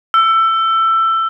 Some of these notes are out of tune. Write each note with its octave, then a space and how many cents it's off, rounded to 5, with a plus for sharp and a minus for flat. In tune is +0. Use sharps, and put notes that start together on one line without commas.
E6 +20